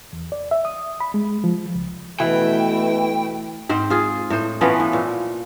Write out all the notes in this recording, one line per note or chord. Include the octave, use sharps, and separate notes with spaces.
E2
D5
E5
D#6
B5
G#3
F3
C#2
B2 E3 A3 E4 G5
G#2 C4 C5
F4 G#4
A2 C5
E3 F3 B3 C#4
A2
A#2